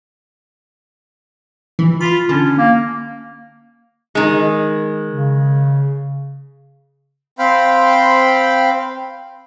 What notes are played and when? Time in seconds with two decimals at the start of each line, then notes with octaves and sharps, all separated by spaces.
1.79 E3
2.01 F4 B5
2.29 D3 C#4
2.58 A#3
4.15 D#3 G#3
5.10 C#3
7.39 C4 C5 F5 G5 B5